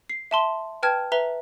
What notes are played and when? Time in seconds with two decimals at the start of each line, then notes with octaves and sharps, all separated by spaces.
0.09 C7
0.31 E5 A5 C6 G7
0.83 B4 G5 A5 F6 G#6
1.12 B4 E5 A#5 G7